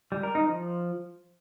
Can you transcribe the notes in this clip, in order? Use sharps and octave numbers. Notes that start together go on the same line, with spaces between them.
G3
A#4
D#4
F3